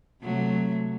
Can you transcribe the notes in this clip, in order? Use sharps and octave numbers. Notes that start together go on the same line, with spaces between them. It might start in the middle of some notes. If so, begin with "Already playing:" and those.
C3 F#3 A3